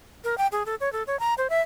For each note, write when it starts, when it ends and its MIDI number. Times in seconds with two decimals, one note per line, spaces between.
0.24 0.37 70
0.38 0.47 79
0.52 0.63 68
0.66 0.75 69
0.81 0.91 73
0.93 1.03 69
1.07 1.19 73
1.20 1.34 82
1.38 1.47 72
1.50 1.61 76